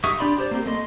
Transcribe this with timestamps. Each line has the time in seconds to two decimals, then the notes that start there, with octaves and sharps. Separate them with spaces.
0.04 D#4 G4 E5 C#6 D#6
0.19 D4 G4 D5 B5 C6
0.38 G4 C5 D5
0.51 A#3 C4 G4
0.66 A3 D#5 C6